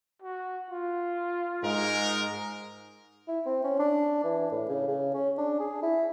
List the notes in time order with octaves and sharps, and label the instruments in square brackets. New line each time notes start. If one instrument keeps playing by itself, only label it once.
[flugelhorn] F#4
F4
[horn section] G#2 G#3 A#4
[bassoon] E4
C4
C#4
D4
E3
A2
C#3
C#3
C#4
D4
G#4
E4